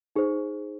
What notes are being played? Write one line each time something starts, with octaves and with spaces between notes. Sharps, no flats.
D#4 G#4 C5